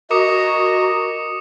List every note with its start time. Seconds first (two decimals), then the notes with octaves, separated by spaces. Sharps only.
0.11 F#4 A#4 D#5 D6 D#6 C#7